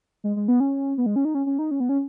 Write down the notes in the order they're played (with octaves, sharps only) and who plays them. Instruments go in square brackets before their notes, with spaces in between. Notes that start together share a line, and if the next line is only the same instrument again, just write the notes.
[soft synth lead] G#3
G#3
B3
C#4
B3
G#3
C#4
D#4
C#4
C#4
D#4
C#4
B3
C#4